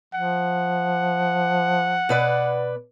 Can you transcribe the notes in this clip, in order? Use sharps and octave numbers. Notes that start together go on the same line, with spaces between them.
F3 F#5
B2 B4 D5